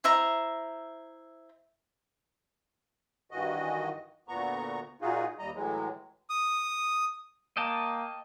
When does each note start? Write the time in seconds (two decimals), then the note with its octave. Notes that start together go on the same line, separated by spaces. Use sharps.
0.04 E4 C5 E5 A#5
3.31 G2 D#3 E3 F#4 D#5
4.28 D2 A#2 B3 A#5 C#6
5.02 A#2 D#4 F4 F#4 G#4
5.39 D#2 G3 D#5 A#5
5.55 A2 E3 F#3 G#3
6.30 D#6
7.57 A#3 D#5 G5 A5